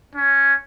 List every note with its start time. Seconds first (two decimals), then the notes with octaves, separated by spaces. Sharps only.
0.16 C#4